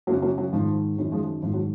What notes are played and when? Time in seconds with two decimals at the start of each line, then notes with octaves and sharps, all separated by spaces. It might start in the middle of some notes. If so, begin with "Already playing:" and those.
0.07 F#2 F#3 A#3
0.12 C#3
0.22 F#3 A#3
0.38 F#3
0.52 G#2 D#3 F3
0.97 F#2 D#3 F#3
1.12 F3 G#3
1.42 G#2 D#3 F3
1.53 F#3